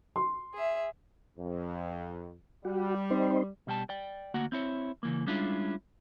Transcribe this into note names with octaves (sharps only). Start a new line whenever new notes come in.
C6
G#4 E5
F2
G3 F#4
C4 D#4 C5
B2 G3 G5 A5
D5 G5
D2 A#3 F#4 F#5
C4 E4 C#5
C#3 E3 A#3
G3 G#3 C#4 D4 E4 F4